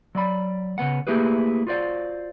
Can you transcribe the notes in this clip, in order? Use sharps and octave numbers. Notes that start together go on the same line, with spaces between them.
F#3 D5 B5
C#3 F3 B3 F#5
A3 A#3 E4 G4 G#4 B4
F4 F#4 C5 D5 F5